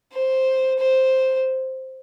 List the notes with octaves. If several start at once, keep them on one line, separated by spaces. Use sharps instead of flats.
C5
C5